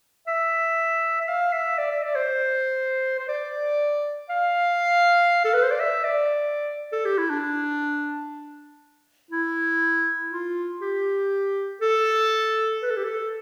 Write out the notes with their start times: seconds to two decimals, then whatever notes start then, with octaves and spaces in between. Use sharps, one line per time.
0.28 E5
1.21 E5
1.28 F5
1.53 E5
1.78 D5
1.90 E5
2.03 D5
2.16 C5
3.19 C5
3.28 D5
4.29 F5
5.45 A4
5.53 B4
5.62 C5
5.71 D5
5.80 E5
6.04 D5
6.92 A4
7.05 G4
7.18 E4
7.30 D4
9.31 E4
10.31 F4
10.81 G4
11.81 A4
12.82 B4
12.90 A4
12.97 G4
13.04 A4